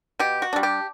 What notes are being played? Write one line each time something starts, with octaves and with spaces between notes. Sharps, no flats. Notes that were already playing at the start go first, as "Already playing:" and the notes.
B2 G4
F#4
G3 D4
G4